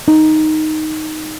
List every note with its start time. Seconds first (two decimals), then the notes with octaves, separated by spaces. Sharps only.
0.08 D#4